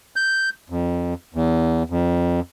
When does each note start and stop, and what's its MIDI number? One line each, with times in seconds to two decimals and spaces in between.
0.16 0.49 91
0.70 1.14 41
1.34 1.83 40
1.90 2.40 41